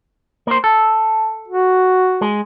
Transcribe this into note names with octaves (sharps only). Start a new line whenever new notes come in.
A#3 C5
A4
F#4
G#3